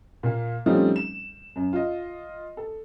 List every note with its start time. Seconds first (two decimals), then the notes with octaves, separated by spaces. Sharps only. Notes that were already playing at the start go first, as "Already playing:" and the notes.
0.23 A#2 A#3 F5
0.66 F3 G3 A3 C4 C#4 D#4
0.96 E7
1.56 F#2
1.73 F4 D#5
2.57 A4